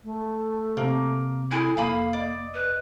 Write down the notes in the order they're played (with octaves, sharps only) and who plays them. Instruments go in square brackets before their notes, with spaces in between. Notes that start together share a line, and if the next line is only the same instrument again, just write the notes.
[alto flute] A3
[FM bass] C3 [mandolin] A#3
[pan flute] E4 [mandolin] G#4 G#5 [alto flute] A4
[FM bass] F1 [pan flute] A#3 [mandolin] F5 B5 D#6
[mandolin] D5 [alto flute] D#5
[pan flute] B4